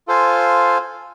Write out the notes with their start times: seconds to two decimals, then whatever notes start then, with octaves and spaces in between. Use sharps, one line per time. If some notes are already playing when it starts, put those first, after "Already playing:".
0.07 F4 A4 C5 F5 G#5